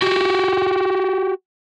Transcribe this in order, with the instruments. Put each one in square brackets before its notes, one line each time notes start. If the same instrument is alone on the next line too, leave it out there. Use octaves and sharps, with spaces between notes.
[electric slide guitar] F#4 G4